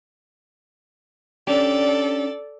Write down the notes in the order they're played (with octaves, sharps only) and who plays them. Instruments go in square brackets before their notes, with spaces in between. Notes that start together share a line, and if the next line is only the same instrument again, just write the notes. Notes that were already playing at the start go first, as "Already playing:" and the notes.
[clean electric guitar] C#4 D4 G4 [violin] A4 D5